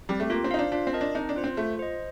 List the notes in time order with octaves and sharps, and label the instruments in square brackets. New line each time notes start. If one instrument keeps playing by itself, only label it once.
[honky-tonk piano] G3 [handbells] C4 G4
[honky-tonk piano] A3
[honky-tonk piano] A#3 [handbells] F4
[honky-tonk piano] C4
[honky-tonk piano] D#4 [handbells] C5 F5
[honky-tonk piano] D4
[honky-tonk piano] D4 [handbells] F4
[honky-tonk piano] C4
[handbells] A#4 D#5 A5
[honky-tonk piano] D4
[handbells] C4 [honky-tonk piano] D#4
[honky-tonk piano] D4
[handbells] F4 C5
[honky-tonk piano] C4
[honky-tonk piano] A3 [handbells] F4
[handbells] C5 D#5